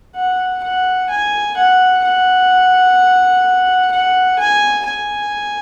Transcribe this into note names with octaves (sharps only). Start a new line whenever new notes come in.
F#5
F#5
G#5
F#5
F#5
F#5
G#5
G#5